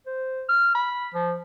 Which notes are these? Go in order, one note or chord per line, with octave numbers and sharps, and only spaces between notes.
C5
F6
B5
F3